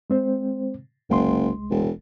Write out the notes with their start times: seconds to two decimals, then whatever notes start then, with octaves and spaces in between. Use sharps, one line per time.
0.10 G#3 C4 C5
1.09 F#1 C2 G#3 C6
1.70 E1